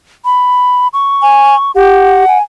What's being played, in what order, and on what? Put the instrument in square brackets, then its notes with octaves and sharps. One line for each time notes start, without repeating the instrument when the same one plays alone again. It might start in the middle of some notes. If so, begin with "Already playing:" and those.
[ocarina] B5
C#6
[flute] G#5
[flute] G4 [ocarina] F#5
[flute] G#5